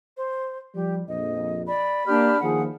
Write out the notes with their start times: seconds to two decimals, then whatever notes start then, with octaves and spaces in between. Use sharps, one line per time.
0.17 C5
0.75 F3 G3 G4
1.08 A#1 F2 D#5
1.67 D5 B5
2.07 A#3 D4 G4 D5 F6
2.41 D#2 F3 G#4 F#5